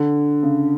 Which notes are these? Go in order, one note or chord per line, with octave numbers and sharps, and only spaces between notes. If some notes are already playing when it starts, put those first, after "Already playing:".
Already playing: D3
C#3